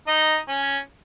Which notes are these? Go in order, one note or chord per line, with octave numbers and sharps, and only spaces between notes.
D#4 D#5
C#4 C#5